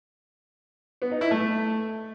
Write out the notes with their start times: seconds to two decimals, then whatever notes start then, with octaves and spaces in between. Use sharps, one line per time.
1.02 B3
1.11 D#4
1.21 E4
1.31 A3